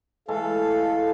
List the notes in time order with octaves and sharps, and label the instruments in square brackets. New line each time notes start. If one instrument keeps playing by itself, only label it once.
[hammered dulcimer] E3 G#3 A3 [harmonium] A4 F5